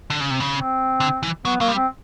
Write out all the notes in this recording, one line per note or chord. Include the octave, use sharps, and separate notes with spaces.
D3
C#3
C3
C#3
C4
D3
E3
F#3 B3
F#3 A#3
G3
C4